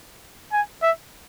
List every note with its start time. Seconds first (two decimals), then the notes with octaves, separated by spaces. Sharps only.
0.52 G#5
0.82 E5